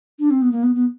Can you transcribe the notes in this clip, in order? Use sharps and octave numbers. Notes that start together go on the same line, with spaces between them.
D4
C4
B3
A#3
B3
B3